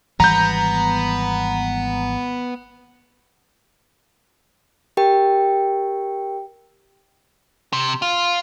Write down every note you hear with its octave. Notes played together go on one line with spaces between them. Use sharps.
G#1 E3 G3 B3 A#5 G6
G4 A#4 G5
C3
F4